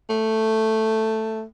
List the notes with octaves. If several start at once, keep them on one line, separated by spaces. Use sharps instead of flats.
A3